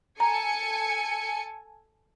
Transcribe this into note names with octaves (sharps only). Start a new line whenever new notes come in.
A4 G#5 A#5 C#7